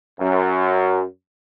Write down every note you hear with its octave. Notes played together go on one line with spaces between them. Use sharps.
F#2